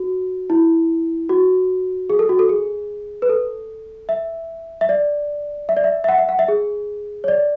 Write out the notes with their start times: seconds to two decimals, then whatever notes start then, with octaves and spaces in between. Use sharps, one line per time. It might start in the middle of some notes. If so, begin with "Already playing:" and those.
Already playing: F#4
0.50 E4
1.29 F#4
2.10 G#4
2.19 A4
2.29 F#4
2.39 A4
2.49 G#4
3.22 B4
3.29 A4
4.09 E5
4.81 E5
4.89 D5
5.69 E5
5.77 D5
5.84 E5
6.04 E5
6.08 F#5
6.18 E5
6.29 F#5
6.39 E5
6.48 G#4
7.24 C#5
7.28 D5